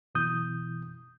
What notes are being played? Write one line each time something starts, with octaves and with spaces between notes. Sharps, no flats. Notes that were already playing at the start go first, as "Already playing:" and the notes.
F#2 B2 E3 D#6 G6